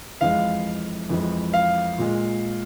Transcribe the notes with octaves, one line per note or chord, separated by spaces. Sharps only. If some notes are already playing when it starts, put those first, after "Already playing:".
F2 E3 G#3 F5
F2 E3 G#3
F5
A#2 G#3